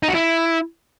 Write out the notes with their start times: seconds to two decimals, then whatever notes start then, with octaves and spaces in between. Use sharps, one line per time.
0.03 D#4
0.08 F#4
0.14 E4